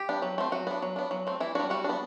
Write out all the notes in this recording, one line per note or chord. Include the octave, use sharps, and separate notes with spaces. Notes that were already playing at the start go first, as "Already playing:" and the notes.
Already playing: G4
B3 D4
F#3
A3 C4
F#3 F#4
B3 D4
F#3
B3 D4
F#3
A3 C4
E3 E4
G3 D4 F#4
G3 F#4
B3 D4